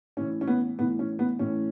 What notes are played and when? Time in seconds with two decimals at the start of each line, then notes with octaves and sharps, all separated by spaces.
0.17 A2 E3 C#4
0.41 C#4
0.47 B3
0.78 A2 B3
0.82 E3
0.99 C#4
1.19 B3
1.39 A2 E3 C#4